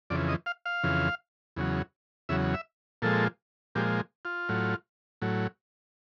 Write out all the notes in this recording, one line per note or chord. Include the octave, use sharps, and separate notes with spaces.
F2 C#3 E3 D5
D#5
F5
F5
F2 C#3 E3
E2 C#3 F#3
E2 C#3 F#3 E5
E5
A#2 F3 G#3 A4
A#2 F3 G#3 G4
F4
A2 F#3
A2 F#3